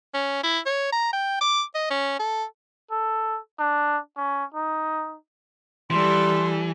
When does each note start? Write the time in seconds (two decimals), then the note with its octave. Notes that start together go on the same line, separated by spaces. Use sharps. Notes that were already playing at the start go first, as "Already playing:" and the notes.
0.14 C#4
0.43 E4
0.65 C#5
0.92 A#5
1.13 G5
1.41 D6
1.75 D#5
1.90 C#4
2.19 A4
2.91 A4
3.59 D4
4.17 C#4
4.55 D#4
5.91 E3 G3 A4 C6